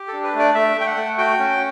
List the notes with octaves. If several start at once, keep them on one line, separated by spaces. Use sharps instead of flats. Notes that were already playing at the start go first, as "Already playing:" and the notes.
Already playing: G4
D4 A4
B4
A3
D5
A3 E5
A3 G5
F#5
A3
F#4 G5
C#4